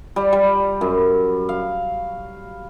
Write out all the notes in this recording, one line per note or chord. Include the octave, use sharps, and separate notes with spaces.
G3
G3
F#2
F5